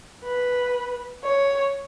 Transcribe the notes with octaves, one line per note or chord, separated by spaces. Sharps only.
B4
C#5